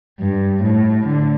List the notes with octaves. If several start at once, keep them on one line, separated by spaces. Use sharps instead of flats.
G2
A2
D3